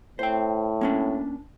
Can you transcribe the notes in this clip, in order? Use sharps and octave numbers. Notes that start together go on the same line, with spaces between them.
A2 C5 G5
A#3 C#4 D4